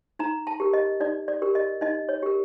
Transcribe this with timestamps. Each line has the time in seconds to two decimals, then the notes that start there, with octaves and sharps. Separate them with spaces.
0.19 D#4 A#5
0.47 A5
0.60 G4 A#4
0.73 D#5
1.00 D#4 D5
1.28 D5
1.42 G4 A#4
1.55 D#5
1.81 D#4 D#5
2.09 C#5
2.23 G4 A#4